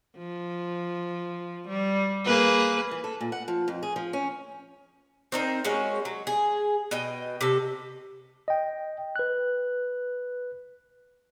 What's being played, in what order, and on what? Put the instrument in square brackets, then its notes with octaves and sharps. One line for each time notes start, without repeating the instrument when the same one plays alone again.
[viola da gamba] F3
G3
A#3 G#4 B4
[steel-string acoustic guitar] E3
A4
A#2
F#5
F3
F2
G#4
F3
C#4
[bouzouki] C4 D#4 A#4
G#3 A#3 C#4 F#4
F#3
G#4
B2 D#5 G5
C3 A4
[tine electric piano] D#5 G5
B4 F#6